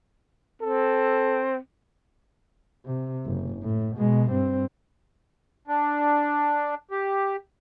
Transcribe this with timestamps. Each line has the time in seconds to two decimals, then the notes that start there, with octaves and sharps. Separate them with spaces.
0.62 C4 A4
2.85 C3
3.26 F#1
3.63 A2
3.97 B2 G#3
4.31 G2 C4
5.68 D4
6.91 G4